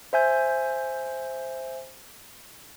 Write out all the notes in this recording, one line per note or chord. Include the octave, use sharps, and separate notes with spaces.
C5 E5 G#5 G6